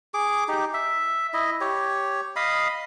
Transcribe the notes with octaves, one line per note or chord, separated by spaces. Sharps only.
G#4 D6
D#4 G4
E5
E4 D#5
G4 C#5
D#5 F5 B5 D#6